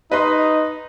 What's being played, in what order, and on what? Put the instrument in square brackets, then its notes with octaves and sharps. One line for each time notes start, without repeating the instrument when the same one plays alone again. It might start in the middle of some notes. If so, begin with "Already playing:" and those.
[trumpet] D#4 [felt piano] B4 D#5 C6